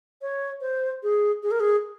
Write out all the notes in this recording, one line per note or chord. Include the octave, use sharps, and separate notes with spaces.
C#5
C5
G#4
G#4
A#4
G#4